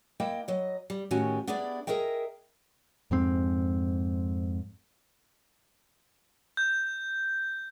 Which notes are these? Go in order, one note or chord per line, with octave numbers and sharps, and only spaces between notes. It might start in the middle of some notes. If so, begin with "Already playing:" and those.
A#3 E4 D#5 G5 A5
F#3 D#5
G3
A2 D#3 C#4 F#4 G4 G#5
B3 D4 E4 G4 G#4 D5
G#4 A#4 D#5 E5 G5
F2 G#2 C4
G6